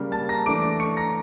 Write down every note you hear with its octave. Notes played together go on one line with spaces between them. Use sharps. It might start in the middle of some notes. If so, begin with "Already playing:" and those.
Already playing: C#3 G3 A#3
A5 A6
A#5 A#6
E3 A3 D4 D6 D7
C#6 C#7
A#5 A#6